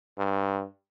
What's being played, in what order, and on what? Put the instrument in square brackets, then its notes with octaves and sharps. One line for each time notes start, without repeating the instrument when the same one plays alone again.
[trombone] G2